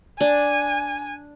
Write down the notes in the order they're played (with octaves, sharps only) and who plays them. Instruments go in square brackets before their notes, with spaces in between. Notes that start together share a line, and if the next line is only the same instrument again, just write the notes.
[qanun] D4 [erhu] G#5